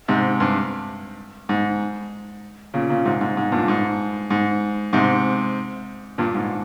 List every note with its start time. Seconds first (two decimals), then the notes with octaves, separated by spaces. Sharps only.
0.08 G#2 C3
0.40 G2
1.49 G#2
2.74 A#2 C#3
2.89 A#2 C#3
3.05 G#2 C3
3.21 G#2
3.37 G#2
3.52 G2 A#2
3.68 G#2
4.30 G#2
4.93 G#2 C3
6.18 G2 A#2
6.34 G#2